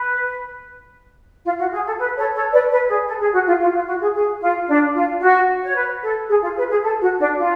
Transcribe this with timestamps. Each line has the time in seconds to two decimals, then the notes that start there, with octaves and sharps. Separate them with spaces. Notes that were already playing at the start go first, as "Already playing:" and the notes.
Already playing: B4
1.45 F4
1.58 F#4
1.72 G#4
1.86 A4
1.99 B4
2.17 A4 C#5
2.35 A4 C#5
2.52 B4 D5
2.71 B4
2.88 G#4
3.06 A4
3.20 G#4
3.33 F#4
3.46 F4
3.60 F4
3.74 F4
3.87 F#4
4.00 G#4
4.14 G#4
4.41 F4
4.68 D4
4.94 F4
5.21 F#4
5.63 C#5
5.75 B4
6.02 A4
6.29 G#4
6.42 F4
6.56 B4
6.69 G#4
6.83 A4
7.01 F#4
7.19 D4
7.37 F4